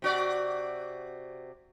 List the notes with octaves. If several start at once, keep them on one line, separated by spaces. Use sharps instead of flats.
C3 F#4 D5